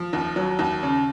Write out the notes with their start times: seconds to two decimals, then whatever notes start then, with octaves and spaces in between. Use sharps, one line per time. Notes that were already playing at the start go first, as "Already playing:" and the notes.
Already playing: F3
0.13 D#2
0.36 F#3
0.59 D#2
0.83 C#3